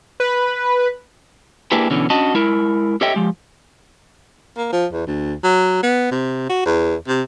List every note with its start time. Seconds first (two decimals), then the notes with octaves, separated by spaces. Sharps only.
0.20 B4
1.72 A#3 D4 E4 G4 G#4 B4
1.90 B2 D3 E3 C#4
2.10 C#4 D4 F#4 D#5 A5
2.34 G#3 E4 A#4
3.01 G4 A4 C#5 D#5 E5 G5
3.15 F3 G#3 G4
4.57 A#3
4.73 F3
4.93 E2
5.07 D2
5.44 F#3
5.83 B3
6.11 C3
6.50 F#4
6.66 E2
7.07 C3